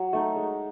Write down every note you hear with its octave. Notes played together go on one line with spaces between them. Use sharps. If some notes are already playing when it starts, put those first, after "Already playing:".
Already playing: F#3
A3 D#4
G#3